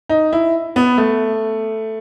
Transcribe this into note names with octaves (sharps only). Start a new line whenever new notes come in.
D#4
E4
B3
A3